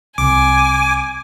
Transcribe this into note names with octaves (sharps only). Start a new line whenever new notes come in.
C2 G#5 D6